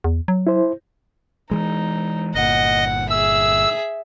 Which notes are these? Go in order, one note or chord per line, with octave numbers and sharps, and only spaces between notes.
E2
F#3
E4 C5
E3 G#3 D#4
G1 A#2 D#5 F#5
G#4 E5 E6